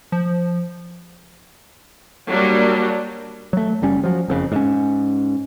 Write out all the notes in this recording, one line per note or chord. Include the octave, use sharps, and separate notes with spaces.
F3
F#3 G3 A#3 D4
F#3 A3
F#1 G3 C#4
F3 F#3
F#1 F2 C#3
G#2 C#4